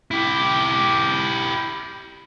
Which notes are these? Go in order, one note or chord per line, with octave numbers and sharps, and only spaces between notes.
E4 G4